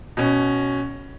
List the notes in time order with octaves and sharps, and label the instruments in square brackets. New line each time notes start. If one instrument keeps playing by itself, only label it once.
[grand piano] B2 C#4